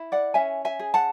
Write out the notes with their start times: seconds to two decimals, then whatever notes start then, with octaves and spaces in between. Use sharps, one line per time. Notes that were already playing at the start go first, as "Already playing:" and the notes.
Already playing: E4
0.12 D5 F#5
0.34 C#4 E5 G#5
0.65 E5 G#5
0.79 G#4
0.94 F#5 A5